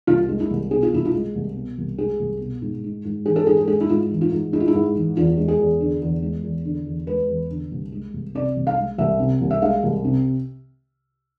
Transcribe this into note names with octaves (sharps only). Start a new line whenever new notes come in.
C2 F4
G#3
E4
C2
B2 G#4
F4
C2 E4
F4
G#3
C2
B2
C2
G#3 G#4
C2
B2
G#2
G#3
G#2
E3 G#4
A4
G#2 G#4
A4
G#3 G#4
E4
G#2 F4
E3
F4
G#2
G#3 E4
F4
E4
G#2
E3
E2 F4
G#3
G#4
E2
D3
E2
G#3
E2
D3
E2
G#3 B4
E2
D3
C2
G#3
C2
C3 D5
C2
F5
G#3
C2 E5
C3
C2
E5
G#3 F5
C2
C3